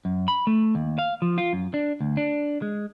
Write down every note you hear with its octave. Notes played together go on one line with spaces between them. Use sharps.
F#2
B5
A3
D#2
F5
F3
F4
F#2
D4
D2
D4
G#3